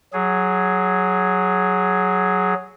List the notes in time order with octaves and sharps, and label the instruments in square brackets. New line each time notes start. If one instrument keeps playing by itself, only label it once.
[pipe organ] F#3 G#4